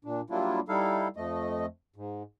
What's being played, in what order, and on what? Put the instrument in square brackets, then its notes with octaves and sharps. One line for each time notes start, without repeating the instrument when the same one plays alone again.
[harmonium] A#2 D4
F#3 G3 A#3 D4 E4 F4
G3 D#4 E4 A4 F5
F2 F3 A3 D#5
G#2